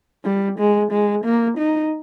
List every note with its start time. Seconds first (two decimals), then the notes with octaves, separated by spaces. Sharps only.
0.25 G3
0.59 G#3
0.92 G#3
1.25 A#3
1.58 D#4